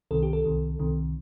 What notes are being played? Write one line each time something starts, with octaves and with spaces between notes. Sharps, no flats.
C2 C3 D#3 A4
G4
A4
C2 C3 D#3
C2 C3 D#3